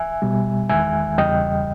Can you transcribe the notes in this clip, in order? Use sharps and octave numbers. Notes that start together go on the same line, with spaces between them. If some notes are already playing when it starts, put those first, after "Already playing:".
Already playing: E5 G#5
B2 G3
E2 D#3 G#3 E5 G#5
E2 C#3 G3 D#5 G5